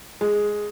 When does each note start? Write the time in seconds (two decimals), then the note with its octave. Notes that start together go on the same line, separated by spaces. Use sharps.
0.21 G#3